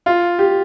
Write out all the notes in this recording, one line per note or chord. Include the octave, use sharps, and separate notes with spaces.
F4
G4